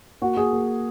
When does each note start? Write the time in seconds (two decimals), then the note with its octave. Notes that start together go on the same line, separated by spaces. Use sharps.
0.22 A#3 F#4
0.37 A#3 G#4
0.52 A#3